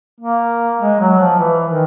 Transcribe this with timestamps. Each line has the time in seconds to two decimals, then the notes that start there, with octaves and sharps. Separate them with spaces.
0.20 A#3
0.80 G#3
1.00 F#3
1.19 F3
1.39 E3
1.68 D#3